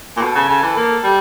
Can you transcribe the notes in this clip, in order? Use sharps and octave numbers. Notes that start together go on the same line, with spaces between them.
A#2
B2 A4
C#3
C#3
E3
A#3
G3